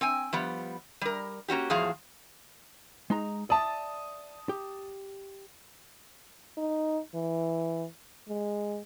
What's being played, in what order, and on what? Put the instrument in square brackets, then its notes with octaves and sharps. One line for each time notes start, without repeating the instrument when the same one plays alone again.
[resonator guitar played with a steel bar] C4 G5 G#5
F3 G3 B3
G3 A#4
A#3 C#4 F#4 G4
E2 A2 F3 F#3 G#4 F5
[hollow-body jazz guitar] G#3 D#4 A#5
[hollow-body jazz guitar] D5 E5 [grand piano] A5 D#6
[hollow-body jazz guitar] G4
[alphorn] D#4
E3
G#3